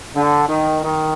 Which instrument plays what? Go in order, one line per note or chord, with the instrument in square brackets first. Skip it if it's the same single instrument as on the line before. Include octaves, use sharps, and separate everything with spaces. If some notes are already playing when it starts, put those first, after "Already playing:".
[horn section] D3
D#3
D#3